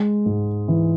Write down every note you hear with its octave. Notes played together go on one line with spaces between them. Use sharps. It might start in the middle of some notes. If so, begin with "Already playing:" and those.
Already playing: G#3
G#2
E3